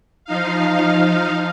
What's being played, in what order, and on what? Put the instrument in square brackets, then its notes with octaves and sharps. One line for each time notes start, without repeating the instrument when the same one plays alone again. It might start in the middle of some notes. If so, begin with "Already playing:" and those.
[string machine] F3 D#4 F5